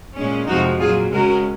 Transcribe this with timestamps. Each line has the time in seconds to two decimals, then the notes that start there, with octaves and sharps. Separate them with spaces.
0.16 A#2 G#3 C#4
0.48 F2 C3 F3 G#3 D#4 F#4
0.80 A#2 F#3 A#3 F4 G#4
1.12 C#3 G#3 C#4 F#4 A#4